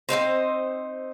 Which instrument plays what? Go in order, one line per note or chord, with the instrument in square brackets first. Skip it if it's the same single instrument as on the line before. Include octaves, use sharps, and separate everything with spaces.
[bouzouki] C4 C#4 D#4 C5